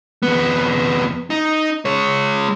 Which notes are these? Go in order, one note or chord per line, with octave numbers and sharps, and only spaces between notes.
F2 B3
D#4
G#3 C#5